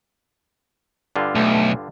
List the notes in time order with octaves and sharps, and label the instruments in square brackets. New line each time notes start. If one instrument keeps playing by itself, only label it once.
[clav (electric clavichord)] G2 D3 F4
[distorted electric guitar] B1 [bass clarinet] A3